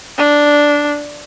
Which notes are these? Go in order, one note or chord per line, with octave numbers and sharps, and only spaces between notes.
D4